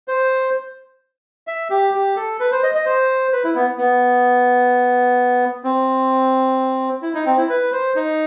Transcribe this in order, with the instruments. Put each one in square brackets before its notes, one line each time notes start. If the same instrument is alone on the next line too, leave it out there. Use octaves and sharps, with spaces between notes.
[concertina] C5
E5
G4
G4
A4
B4
C5
D#5
D#5
C5
B4
E4
B3
B3
C4
E4
D#4
C4
E4
B4
C5
D#4